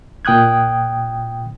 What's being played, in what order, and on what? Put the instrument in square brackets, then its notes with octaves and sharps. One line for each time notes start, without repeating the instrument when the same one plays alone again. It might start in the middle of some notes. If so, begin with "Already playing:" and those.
[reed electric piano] A#2 G5 D#6 F#6 G#6